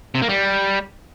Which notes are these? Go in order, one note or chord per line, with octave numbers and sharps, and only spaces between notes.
C3
A#3
G3